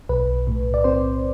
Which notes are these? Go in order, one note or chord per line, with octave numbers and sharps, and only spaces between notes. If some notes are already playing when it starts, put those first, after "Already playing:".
B1 B4
A2
D5
C4 C5